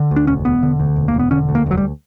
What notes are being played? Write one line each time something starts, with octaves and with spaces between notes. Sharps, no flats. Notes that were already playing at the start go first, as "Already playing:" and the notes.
Already playing: D3
D2
D4
E1 C#4
E1 B3
D3
D2
E1
A#3
E1
B3
D3 C#4
D2
A#3
E1 F#3
G3